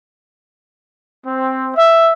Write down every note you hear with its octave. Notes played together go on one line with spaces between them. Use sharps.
C4
E5